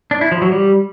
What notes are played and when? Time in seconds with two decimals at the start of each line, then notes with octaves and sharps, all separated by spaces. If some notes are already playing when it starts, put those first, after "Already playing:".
0.11 D4
0.21 E4
0.32 F3
0.42 F#3
0.52 G3